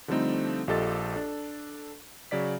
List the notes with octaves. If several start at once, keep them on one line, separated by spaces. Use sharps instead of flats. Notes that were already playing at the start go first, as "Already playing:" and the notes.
D3 F3 G3 A3 C4 D#4
A#1 F4 G4 A4 D#5 A6
D4 A4
C#3 F#3 D5 B6